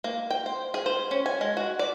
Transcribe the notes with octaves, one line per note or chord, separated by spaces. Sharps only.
A#3
G5
C5
G#4
C5
C#4
G#5
G#3
F#4
D5